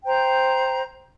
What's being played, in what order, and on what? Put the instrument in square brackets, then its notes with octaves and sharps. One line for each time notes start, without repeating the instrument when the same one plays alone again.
[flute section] C5 G5 A#5